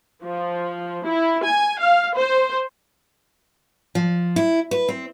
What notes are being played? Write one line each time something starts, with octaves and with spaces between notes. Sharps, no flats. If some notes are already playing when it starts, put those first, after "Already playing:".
F3
E4
G#5
F5
C5
F3
E4
B4
C4